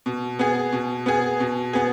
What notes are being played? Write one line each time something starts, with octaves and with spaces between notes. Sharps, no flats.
B2
B3 G#4
B2
B3 G#4
B2
B3 G#4